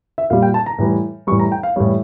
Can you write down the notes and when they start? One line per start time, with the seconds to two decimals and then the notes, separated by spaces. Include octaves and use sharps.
0.18 E5
0.30 A#2 G3 F5
0.42 G5
0.54 A5
0.66 A#5
0.78 A2 E3 G3
1.27 A2 E3 G3 C#6
1.39 A#5
1.52 G5
1.63 F5
1.76 A2 E3 G3 C#5